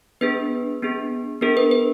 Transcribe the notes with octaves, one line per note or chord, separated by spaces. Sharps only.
B3 D4 G#4 B4
B3 D4 G#4
B3 D4 G#4 A#4
B4
B4